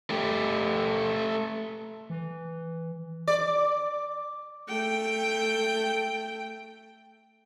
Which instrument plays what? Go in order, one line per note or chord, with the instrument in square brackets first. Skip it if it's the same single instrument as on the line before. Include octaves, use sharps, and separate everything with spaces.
[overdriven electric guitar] A3 G4
[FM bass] E3
[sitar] D5
[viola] A3 G5